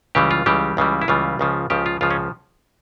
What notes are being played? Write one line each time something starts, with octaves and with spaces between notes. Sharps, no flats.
C#2 C#3 E3 G3 G4
F4
C#2 C#3 E3 G3 G4
C#2 C#3 E3 G3
E4
C#2 C#3 E3 G3 F4
C#2 C#3 F3
C#2 C#3 F3 G4
F4
C#2 C#3 F3 F4
C#4